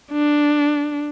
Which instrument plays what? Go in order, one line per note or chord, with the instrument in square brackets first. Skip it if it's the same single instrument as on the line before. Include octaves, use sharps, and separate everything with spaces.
[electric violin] D4